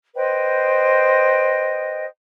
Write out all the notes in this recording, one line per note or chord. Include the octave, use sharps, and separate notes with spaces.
B4 C5 D#5 G5